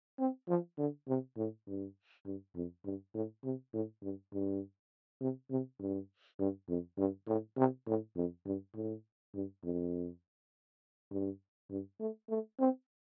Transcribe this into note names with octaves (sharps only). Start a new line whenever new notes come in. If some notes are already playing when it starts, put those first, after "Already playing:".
C4
F3
D3
C3
A2
G2
G2
F2
G2
A2
C3
A2
G2
G2
C3
C3
G2
G2
F2
G2
A2
C3
A2
F2
G2
A2
G2
F2
G2
G2
A3
A3
C4